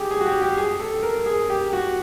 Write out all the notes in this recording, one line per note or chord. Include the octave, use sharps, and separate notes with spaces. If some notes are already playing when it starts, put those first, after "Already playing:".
Already playing: G4 G#4
G#4
F#4
G4
G4
G#4
A4
A#4
G#4
G4
F#4